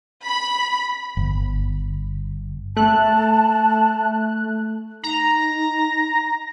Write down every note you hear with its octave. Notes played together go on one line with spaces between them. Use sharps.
B5
G1
A3 A5 F#6
D#4 A#5